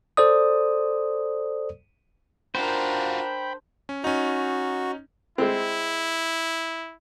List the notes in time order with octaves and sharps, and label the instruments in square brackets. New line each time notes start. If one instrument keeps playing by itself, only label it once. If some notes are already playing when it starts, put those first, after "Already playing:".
[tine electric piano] A4 C5 D5 D#6
[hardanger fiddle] D4 A#4 [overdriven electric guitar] F4 F#4 [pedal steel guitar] C5 [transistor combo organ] G5 B5
[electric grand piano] C#4
[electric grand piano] C#4 D#4 [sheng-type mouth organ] F#4
[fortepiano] G#3 C4 [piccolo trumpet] E4